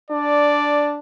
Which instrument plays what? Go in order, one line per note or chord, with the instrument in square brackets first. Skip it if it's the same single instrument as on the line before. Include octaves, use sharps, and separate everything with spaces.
[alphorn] D4 [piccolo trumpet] D5